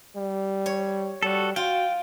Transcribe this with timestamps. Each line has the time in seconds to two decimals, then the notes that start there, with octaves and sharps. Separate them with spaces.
0.16 G3
0.66 C#5
1.22 G3 F#4 A4
1.56 F4 F#4 G5